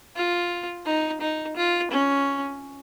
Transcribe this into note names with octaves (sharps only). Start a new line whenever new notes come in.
F4
D#4
D#4
F4
C#4